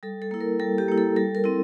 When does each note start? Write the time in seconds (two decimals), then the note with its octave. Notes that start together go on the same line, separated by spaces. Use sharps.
0.03 G3 A4
0.22 A4
0.31 A#3 E4
0.41 A#4
0.60 G3 A4
0.78 G4
0.88 A#3 E4
0.98 A4
1.16 G3 A4
1.35 A#4
1.44 C4 E4